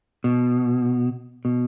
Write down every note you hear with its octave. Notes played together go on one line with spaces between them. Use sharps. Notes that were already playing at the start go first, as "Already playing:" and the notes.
B2
B2